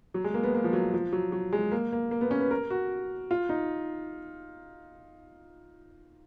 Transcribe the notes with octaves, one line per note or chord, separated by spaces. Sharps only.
F#3
G#3
A#3
B3
A#3
F3
F#3
F3
F#3
F#3
G#3
A#3
A#3
A#3
B3
C#4
B4
A#4
F#4
F4
D#4